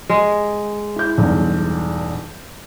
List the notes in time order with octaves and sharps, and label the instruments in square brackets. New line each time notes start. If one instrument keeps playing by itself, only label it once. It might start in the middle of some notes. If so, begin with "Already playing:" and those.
[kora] G#3
[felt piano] E4 G6
B1 E2 G2